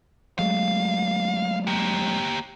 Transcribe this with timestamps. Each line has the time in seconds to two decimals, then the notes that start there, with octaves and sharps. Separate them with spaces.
0.39 F#3 G#3 A3 F5
1.67 A#3 G4